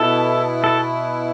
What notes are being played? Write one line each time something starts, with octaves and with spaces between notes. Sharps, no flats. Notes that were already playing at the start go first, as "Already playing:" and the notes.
Already playing: B2 B3 E4 A4
A4